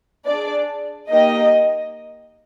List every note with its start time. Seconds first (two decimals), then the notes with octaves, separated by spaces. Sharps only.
0.26 D4 G#4 D5
1.10 A#3 D#4 G4 D#5